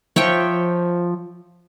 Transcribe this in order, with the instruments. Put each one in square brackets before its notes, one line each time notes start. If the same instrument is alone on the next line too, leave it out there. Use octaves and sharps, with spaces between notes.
[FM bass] F3 [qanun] C#5 E5 G5